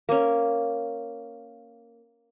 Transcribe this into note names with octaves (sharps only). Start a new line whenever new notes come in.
A#3 C#4